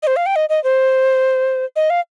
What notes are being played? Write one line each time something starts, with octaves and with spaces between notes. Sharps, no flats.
D#5
C5
F5
G5
D#5
D#5
C5
D#5
F5